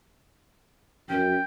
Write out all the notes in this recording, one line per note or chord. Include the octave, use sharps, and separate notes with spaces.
F#2 C#4 G5